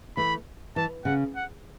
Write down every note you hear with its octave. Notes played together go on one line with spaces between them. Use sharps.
E3 A3 B5
E3 A5
C#3 F#5
F#5